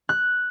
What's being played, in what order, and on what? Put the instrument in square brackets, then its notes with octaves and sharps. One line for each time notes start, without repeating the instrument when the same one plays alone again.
[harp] F#6